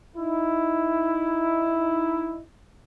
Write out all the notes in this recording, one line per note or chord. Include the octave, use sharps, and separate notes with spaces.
D#4 E4